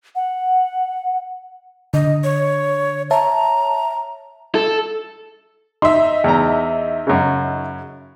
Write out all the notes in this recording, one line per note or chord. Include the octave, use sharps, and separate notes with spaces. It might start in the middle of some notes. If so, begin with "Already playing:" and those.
F#5
D3 D#5
C#5
C#5 E5 A5 A#5
A4
D#4 E5 C6
E2 A#5
F#2 C#3